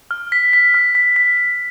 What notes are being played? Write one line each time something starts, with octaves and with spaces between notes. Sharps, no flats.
F6
B6
B6
F6
B6
B6
B6